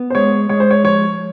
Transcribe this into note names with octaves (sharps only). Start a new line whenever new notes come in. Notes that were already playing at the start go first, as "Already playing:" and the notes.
Already playing: B3
C5
G#3 C#5
G#3 C#5
C5
C#5
F3 C#5